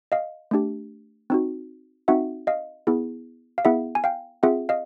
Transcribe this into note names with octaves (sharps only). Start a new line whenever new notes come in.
D#5 F5
A3 D4 G4
C4 D#4 F#4
C4 D#4 F#4 E5 F#5
D#5 F5
B3 E4 G#4
F5
B3 E4 G#4 E5 F#5
G#5
F5 G5
C4 F4 G#4 E5 F#5
D#5 F5